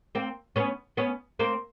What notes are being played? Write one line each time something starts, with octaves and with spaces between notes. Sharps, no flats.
A#3 C4
B3 C#4
B3 C#4
A#3 C4